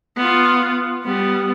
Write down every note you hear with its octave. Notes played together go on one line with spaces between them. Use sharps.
B3 F4
G3 B3